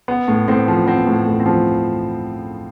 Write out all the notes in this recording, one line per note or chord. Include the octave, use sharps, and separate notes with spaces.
B3
A2
A2 C4
F3
B3 C4
A2
A2
C4
F3